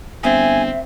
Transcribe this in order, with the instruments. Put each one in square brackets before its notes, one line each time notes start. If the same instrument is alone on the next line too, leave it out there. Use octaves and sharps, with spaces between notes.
[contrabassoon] G1 [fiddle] C4 [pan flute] E5 [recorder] G#5